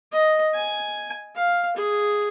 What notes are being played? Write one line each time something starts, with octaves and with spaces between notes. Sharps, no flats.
D#5
G#5
F5
G#4